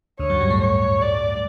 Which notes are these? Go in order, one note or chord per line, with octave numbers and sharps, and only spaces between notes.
D2 D3 C#5
F#2 F#3
G2 G3
A2 A3
C#5
D5